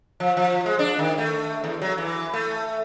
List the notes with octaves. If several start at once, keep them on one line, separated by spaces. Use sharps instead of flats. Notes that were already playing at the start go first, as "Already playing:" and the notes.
F3
F3
G#3
D4
D#3
A3
E2
F#3
E3
A3